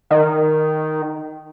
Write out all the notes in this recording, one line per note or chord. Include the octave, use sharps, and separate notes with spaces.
D#3